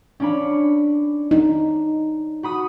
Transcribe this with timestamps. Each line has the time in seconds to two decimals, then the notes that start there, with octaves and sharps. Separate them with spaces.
0.20 C#4 D4 B5
1.31 D#4
2.43 F#4 B5 D#6